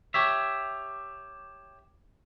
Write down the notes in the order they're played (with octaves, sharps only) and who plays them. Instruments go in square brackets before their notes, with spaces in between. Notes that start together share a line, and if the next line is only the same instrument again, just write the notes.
[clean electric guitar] G4 C#5 E5